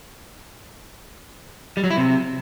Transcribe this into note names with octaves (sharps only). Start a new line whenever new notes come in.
G3
F#3
E4
C3